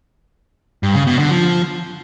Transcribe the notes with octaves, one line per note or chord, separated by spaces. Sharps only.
G2
C#3
B2
D3
F3